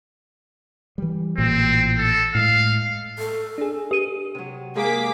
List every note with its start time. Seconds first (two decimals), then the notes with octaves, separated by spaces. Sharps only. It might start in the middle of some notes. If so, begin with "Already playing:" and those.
0.98 E3 G3
1.38 A1 A#2 E3 C4
1.98 A4
2.35 A2 G#3 F5
3.19 A4
3.58 D4 G#4
3.91 G4 D#7
4.35 C3 F#3
4.75 G#3 A#3 G#4 D6 B6